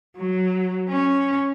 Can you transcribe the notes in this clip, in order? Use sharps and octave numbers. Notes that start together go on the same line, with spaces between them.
F#3
C#4